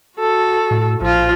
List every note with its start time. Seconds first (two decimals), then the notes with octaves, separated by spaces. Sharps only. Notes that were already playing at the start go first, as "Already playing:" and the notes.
0.18 F#4 A4
0.71 A2
1.01 A#1 F3 F4